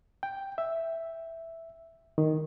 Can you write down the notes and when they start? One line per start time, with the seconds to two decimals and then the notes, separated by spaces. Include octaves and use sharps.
0.23 G5
0.58 E5
2.18 D#3